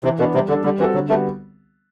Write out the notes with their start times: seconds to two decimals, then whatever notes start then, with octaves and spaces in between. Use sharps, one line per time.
0.04 C3 E3
0.19 B2 B3 D4
0.34 C3 G3
0.49 D3 D4
0.52 A4
0.64 D3 G3
0.79 E3 C4 F#4 A4
0.94 D3 F#3
1.09 G3 A3 B3 F#4